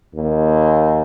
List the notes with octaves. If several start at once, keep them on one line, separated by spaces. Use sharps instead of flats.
D#2